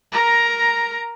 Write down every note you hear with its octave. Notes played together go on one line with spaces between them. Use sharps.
A#4 A#5